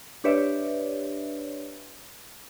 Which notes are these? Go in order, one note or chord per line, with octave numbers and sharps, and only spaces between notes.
D4 G4 B4 C#5 D5 E5